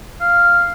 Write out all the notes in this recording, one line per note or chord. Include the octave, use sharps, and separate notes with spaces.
F5